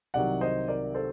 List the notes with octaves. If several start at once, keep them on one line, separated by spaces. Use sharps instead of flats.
C2 C3 D#3 F#3 D5 F#5
C5 D#5
A#4 D5
A4 C5